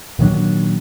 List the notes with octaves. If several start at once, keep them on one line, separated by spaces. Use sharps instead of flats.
A#2 D#3 F#3 D4